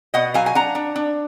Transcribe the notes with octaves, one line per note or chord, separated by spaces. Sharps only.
B2 D#5 F#5
F#3 F5 G#5
G#5
D4 F#5 A#5
D4
D4